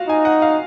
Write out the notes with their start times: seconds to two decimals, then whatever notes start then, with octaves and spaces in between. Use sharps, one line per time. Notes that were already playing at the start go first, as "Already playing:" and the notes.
Already playing: F4 F#4 F5
0.09 D#4 G#5
0.25 F#5
0.42 F5